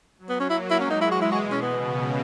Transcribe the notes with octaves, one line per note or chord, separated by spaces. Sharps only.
F#3
B3
C#4
A#3 E4
E4
G#3 C#4
D#4
E4
E3 F#4
E4
F#4
B2
C#4
B3
C#3